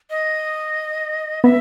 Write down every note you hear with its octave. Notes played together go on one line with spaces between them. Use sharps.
D#5
B3 E5